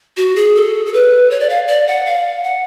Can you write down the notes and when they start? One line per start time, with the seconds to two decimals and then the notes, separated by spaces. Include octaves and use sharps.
0.17 F#4
0.36 G#4
0.55 A4
0.86 A4
0.93 B4
1.31 C#5
1.40 D5
1.49 F5
1.68 D5
1.87 F#5
2.06 F5
2.44 F#5